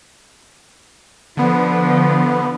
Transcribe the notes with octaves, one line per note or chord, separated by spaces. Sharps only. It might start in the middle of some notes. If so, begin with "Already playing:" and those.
D3 F3 B3